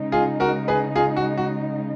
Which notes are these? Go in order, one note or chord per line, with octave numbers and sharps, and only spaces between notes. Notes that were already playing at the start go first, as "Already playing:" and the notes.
Already playing: C#3 G#3 D#4
F4 G#4
F#4 A#4
G#4 B4
F4 G#4
F#4
F#4